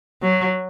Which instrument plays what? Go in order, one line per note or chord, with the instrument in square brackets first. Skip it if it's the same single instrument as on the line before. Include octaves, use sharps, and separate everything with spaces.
[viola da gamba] F#3